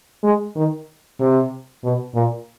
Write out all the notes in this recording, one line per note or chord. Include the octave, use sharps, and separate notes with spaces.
G#3
D#3
C3
B2
A#2